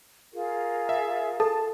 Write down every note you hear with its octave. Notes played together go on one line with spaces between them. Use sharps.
F4 G#4 A#4
E5
A4 A5